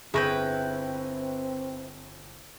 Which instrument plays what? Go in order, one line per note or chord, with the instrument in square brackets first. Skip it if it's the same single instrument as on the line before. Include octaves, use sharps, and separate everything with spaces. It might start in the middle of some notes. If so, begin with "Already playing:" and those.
[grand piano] G1 C#6 A#6 [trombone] C4 [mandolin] E4 B4 G5 [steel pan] G#4